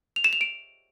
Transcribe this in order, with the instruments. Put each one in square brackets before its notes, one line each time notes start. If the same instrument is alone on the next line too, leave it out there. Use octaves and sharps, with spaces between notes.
[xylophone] F7
E7
F7
D7